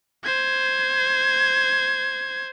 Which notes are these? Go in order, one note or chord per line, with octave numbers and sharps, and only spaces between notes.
C5 G#6